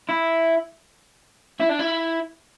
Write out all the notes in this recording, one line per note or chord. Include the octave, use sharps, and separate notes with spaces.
E4
E4
D4
E4